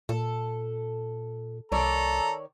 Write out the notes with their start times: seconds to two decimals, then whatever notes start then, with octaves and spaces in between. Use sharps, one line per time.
0.09 A#2 A4
1.72 C2 D#3 A4 C#5 D5 A#5